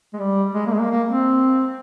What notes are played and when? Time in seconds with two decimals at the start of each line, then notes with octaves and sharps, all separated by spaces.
0.14 G#3
0.19 G3
0.55 G#3
0.67 A#3
0.73 G#3
0.79 A#3
0.90 A#3
1.09 C4